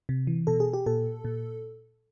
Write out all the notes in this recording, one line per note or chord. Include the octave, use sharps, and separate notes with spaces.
C3
E3
B2 A4
G#4
G4
A#2 A4
A#2